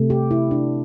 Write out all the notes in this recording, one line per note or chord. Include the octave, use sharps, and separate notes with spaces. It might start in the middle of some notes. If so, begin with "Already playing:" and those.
Already playing: C3 A3
G4
E4
D4